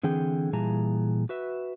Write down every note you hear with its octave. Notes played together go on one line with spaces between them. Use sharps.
D3 E3 C4 G#4 G5
A#2 E3 G3 G#4 A5 A#5
F#4 B4 E5